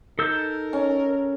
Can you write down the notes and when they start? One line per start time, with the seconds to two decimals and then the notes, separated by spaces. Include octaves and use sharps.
0.19 D#4 A4 A#4 E6 G6
0.73 C#4